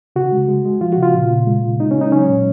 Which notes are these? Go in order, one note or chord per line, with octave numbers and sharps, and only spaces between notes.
C#3 F#4
G#3
G#3
G#3
F3 F4
F#4
C#3 F4
A#2
A#2
G#3
C#3
G#3 D#4
C#4
G#3 D#4
F#3 C#4
A#2